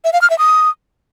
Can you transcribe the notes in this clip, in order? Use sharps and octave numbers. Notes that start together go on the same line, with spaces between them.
E5
F5
F6
E5
D#6